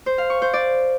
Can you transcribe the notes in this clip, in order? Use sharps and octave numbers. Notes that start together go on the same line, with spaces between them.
C5
F5
C#6
C5
D5